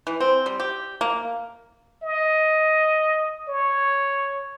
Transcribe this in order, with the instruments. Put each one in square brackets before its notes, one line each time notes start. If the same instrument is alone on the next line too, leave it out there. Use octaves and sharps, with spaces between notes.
[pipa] E3
C4
G3
G4
A#3
[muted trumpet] D#5
C#5